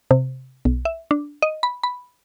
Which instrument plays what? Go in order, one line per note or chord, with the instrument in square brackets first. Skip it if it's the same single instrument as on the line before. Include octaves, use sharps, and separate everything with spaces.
[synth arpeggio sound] C3
B1
E5
D4
D#5
B5
B5